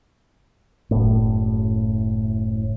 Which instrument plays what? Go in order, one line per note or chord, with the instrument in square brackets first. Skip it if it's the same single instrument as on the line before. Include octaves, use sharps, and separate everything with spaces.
[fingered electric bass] F#1 A2